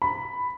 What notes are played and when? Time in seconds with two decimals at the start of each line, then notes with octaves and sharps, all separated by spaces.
0.02 B5